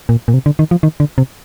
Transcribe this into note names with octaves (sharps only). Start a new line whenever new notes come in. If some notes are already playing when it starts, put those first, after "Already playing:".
A#2
A#2
C3
D3
D#3
F3
D#3
D3
C3